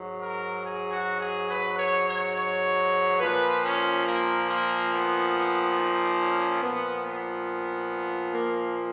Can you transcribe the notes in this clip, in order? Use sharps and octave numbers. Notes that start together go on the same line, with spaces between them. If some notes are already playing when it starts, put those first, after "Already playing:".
Already playing: G#2 F#3
A#4
G#4
F#4
G#4
B4
C#5
C#5
C#5
A#2 F3 B4
C#4
A#3
A#3
B3
D#4
C#4
A#2 F3 B3
B3
A#3